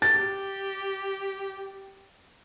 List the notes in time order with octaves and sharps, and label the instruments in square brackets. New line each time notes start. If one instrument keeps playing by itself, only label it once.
[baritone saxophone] G4 [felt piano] A6